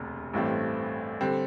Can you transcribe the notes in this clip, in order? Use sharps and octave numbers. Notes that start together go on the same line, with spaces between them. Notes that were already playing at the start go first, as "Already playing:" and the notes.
Already playing: E1 D2 C3
A1 G2 E3 A3 C4
D3 G3 C4